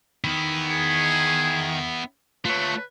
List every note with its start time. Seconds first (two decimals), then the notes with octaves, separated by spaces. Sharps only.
0.24 D#3 B3 E4
0.70 G#4
2.45 A3 F4 B4 C#5